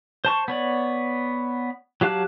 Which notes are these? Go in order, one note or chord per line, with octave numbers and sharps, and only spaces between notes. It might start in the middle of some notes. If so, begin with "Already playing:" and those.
C5 A5 C#6
B3 C#5 D5
F#3 G4 F5 A5 F#6